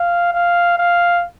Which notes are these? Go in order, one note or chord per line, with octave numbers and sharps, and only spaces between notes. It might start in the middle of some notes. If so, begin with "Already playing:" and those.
Already playing: F5
F5
F5